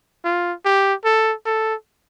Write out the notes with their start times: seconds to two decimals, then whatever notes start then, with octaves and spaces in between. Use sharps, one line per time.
0.24 F4
0.65 G4
1.05 A4
1.46 A4